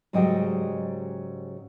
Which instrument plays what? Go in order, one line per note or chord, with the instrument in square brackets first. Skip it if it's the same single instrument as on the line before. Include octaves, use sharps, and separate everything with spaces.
[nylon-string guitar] G#2 C#3 F#3 G3 D#5 G5